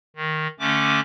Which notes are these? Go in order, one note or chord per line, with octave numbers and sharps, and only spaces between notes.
D#3
D3 A3 C#4 D6